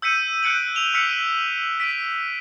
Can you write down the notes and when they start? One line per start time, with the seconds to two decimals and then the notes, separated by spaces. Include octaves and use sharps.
0.02 E6 G6 B6 C#7 D#7
0.43 F#6 G6 C#7 D7 F#7
0.75 E6 E7 F7 G7
0.94 E6 F6 B6 C#7 F7 G7
1.09 B6 D#7
1.80 B6 D7 D#7